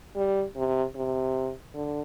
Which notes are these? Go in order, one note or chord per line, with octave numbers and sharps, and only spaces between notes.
G3
C3
C3
D3